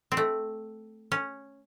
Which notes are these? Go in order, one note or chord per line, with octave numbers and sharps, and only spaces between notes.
C4
A3
C#4